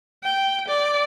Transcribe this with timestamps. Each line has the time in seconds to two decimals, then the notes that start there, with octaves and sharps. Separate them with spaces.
0.23 G5
0.68 D5